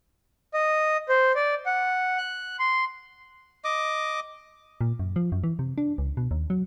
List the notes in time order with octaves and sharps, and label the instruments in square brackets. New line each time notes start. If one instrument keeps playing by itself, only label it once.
[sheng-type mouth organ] D#5
C5
D5
F#5
F#6
C6
[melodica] D#5 D6
[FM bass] A#2
F#2
F3
F#2
E3
C3
D4
C#2
B2
D#2
F#3